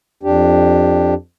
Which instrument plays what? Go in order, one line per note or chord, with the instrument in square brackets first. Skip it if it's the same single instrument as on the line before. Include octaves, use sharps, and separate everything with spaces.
[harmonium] F2 D4 G4